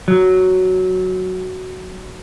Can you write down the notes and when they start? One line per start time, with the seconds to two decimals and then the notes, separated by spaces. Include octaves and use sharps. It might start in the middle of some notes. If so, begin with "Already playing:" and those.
0.08 F#3